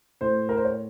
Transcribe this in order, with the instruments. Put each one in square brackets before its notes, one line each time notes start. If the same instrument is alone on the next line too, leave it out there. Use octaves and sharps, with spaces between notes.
[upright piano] A2 C5
A#4
C5
C#5